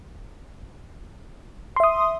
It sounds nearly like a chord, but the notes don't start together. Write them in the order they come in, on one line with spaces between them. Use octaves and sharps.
C6 E5 D#6